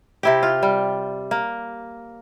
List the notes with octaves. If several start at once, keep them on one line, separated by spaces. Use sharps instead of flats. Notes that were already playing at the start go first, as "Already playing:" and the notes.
C3 E4 G4
F4
G3
A#3